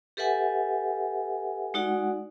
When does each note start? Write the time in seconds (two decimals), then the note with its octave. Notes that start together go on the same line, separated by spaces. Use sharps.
0.17 G4 A4 B4 E5 F#5 G#5
1.74 G#3 D#4 F#4 D5 F#5